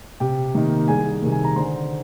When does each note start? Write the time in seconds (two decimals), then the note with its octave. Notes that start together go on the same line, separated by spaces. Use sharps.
0.20 C3 G4 G5
0.55 D#3 A#3 D#4
0.88 C2 G#4 G#5
1.22 C3 D#3
1.32 G#5
1.44 A#5
1.56 D3 C5 C6